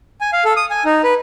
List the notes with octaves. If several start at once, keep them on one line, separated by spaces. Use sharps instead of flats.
G#5
F5
A4
D#6
G#5
D#4
B4